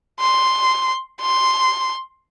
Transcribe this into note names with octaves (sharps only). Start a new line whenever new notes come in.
C6
C6